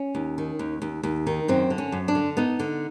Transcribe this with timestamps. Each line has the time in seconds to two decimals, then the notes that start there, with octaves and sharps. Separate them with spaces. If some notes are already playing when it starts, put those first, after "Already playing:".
Already playing: C#4
0.15 D#2
0.38 D#3
0.59 D#2
0.82 D#2
1.03 D#2
1.27 D#3
1.48 F#2 C4
1.70 D3
1.78 C#4
1.92 F#2
2.08 D4
2.15 D3
2.37 B3 D#4
2.60 D3